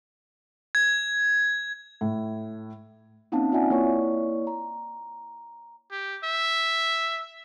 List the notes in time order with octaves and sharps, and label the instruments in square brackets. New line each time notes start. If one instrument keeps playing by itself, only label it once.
[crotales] G#6
[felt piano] A2
[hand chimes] A#3 C4 C#4 D#4 F5 A5
C4 F4 D5 E5 F#5 G#5
A#3 E4 C#5 D5 C#6
A#5
[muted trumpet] G4
E5